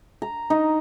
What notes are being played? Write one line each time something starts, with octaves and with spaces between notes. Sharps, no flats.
A#5
D#4